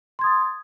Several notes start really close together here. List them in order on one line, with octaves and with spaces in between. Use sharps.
C6 G#6 D#6 A6